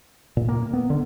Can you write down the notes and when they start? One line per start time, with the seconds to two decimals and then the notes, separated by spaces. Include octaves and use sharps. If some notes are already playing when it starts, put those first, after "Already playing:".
0.37 A#2
0.48 A#3
0.73 B3
0.90 D3